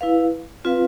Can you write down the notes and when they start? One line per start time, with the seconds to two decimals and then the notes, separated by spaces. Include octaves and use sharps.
0.01 E4 B4 F5
0.64 C4 F4 B4 F5